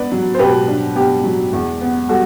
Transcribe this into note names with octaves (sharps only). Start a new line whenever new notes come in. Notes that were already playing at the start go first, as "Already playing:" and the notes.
Already playing: B3 D4 B4 D5
F#3
C5
B2 G4 B4
D4
B3 G4
F#3
E2
B3
G3 F#4 A4